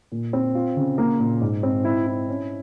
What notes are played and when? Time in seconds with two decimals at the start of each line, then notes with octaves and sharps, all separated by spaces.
0.12 A#2
0.33 C4
0.55 F4
0.76 C#3
0.98 A#3
1.20 A#2
1.41 G#2
1.63 C4
1.84 E4
2.06 E4
2.28 C#4